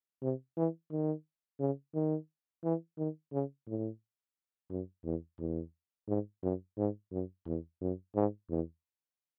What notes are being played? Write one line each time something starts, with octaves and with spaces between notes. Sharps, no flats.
C3
E3
D#3
C#3
D#3
E3
D#3
C#3
A2
F#2
E2
E2
G#2
F#2
G#2
F#2
E2
F#2
G#2
E2